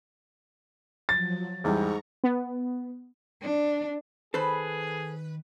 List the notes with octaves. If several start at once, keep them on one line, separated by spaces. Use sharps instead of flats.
F3 F#3 A6
E2 G#2 G3 A#5 C#6
B3
D4
D#3 G#4 A4 B4 C5